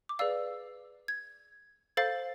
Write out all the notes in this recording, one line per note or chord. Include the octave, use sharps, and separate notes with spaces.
D6
G#4 B4 D5 F5 E6
G#6
A4 C5 F5 A6